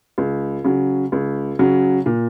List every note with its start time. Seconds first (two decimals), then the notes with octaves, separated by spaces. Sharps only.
0.18 C#2
0.64 C#3 F#3
1.12 C#2
1.59 C#3 F#3
2.06 A#2